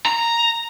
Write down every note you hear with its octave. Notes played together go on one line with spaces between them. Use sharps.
A#5